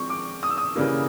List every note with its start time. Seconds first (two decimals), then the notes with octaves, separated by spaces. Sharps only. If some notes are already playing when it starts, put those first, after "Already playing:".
Already playing: F3 G#3 C4 C#6
0.10 D6
0.43 D#6
0.50 E6
0.58 D#6
0.76 C#3 E3 G3 A#3